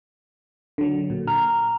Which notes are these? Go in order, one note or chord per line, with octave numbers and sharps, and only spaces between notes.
D3 F#3
A#2
A#5 F6